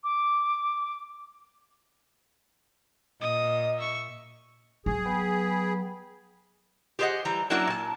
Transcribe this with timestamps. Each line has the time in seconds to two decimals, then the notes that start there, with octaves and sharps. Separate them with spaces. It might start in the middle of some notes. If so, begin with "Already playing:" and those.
0.04 D6
3.21 A#2 D#5 D#6
3.78 E5 C#6
4.86 F#3 G#4
5.05 B3 G5 B5
6.99 G4 G#4 C5 C#5 D#5 F#5
7.25 E3 G3 A#5
7.50 F#3 A#3 C#4 D4 E4 F#4
7.67 A#2 A5